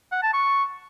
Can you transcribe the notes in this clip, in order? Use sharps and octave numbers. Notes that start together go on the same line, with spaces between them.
F#5
A5
C#6